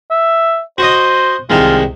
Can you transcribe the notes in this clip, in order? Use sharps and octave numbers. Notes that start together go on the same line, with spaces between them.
E5
F#4 C5 D#5
C2 D#3 G#3 F4